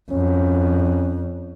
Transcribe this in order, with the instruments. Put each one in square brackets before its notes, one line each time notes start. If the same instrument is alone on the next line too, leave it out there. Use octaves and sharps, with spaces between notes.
[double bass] F2 [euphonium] C#4